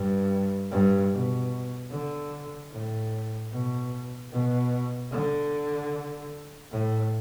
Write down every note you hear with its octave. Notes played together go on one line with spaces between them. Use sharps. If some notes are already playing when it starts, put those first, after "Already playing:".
Already playing: G2
G2
B2
D3
A2
B2
B2
D3
A2